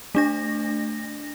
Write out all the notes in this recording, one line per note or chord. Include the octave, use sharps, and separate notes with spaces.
A3 D4 A#6